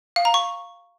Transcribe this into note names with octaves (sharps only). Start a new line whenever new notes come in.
F5
A#5
C#6